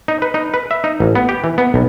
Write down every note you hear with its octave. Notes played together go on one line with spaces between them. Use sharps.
D#4
B4
D#4
B4
E5
D#4
A1
B3
G4
E3
B3
B1